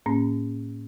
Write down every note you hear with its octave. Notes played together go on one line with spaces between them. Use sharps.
A2 A#3 C#4